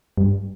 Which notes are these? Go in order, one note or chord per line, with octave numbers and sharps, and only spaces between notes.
G2